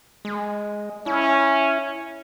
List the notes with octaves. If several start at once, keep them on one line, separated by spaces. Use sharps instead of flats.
G#3
C#4 E4